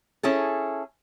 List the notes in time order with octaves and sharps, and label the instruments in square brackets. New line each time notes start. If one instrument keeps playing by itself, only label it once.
[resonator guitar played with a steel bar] C#4 E4 G#4 A4